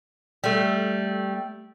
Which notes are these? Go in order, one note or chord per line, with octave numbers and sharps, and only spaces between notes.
G3 A3